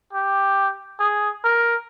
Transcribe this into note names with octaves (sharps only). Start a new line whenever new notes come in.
G4
G#4
A#4